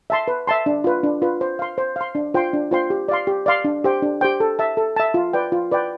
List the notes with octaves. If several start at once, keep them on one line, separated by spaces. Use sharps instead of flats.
E5 A5 C6
B4
E5 A5 C6
D4
F4 B4
D4
F4 B4
C5
F5 C6
C5
F5 C6
D4
F4 C5 G5 C6
D4
F4 C5 G5 C6
G4
D5 F5 C6
G4
D5 F5 C6
D4
G4 C5 G5
D4
G4 C5 G5
A4
E5 A5
A4
E5 A5
F4
B4 D5 G5
F4
B4 D5 G5